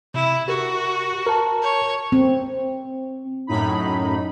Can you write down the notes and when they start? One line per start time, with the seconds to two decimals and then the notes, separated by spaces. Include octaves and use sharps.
0.14 C3 E4
0.48 F#4 G4 A#4
1.26 A#4 A5
1.62 C#5
2.12 C4
3.47 F#2 A2 D#4 B5